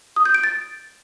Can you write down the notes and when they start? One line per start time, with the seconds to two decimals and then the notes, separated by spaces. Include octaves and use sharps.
0.16 D#6
0.25 G6
0.35 D7
0.44 A6